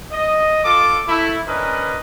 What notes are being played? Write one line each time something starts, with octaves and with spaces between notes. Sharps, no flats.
D#5
F4 A4 D6
A3 E4
C#4 D4 A#4 B4 D#5